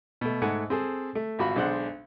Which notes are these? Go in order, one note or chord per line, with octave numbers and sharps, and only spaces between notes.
B2 A3
G#2 A3 F#5 G#5
C4 G#4 A4
A3
G#1 F4 F#4 B5
B1 G#3 D4 C5 F#5 F#6